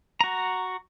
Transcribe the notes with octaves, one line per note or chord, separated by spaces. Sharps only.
F#4 A#5